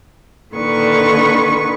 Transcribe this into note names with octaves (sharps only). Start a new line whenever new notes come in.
A#2 D3 D#3 B4 C#6